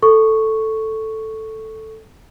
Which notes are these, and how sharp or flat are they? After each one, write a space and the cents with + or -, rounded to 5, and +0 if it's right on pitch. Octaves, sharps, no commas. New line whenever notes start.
A4 +0 C#6 +0